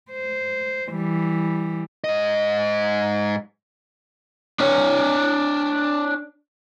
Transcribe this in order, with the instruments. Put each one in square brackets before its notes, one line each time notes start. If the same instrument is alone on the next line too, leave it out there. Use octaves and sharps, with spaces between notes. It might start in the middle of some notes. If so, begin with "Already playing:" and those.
[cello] C5
E3 G3
[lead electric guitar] G#2 D#5
[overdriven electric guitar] D4 C#5